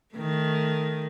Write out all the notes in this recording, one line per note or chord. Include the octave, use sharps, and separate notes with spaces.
D#3 A3